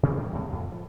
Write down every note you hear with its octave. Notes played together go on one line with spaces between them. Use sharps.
C3 E3 G3 C4
G3 G#3 A#3
D#2 A2 G#3 C4
F2 A2 C3
F3